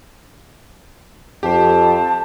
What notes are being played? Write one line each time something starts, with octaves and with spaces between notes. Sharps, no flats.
F2 G4 C5 A5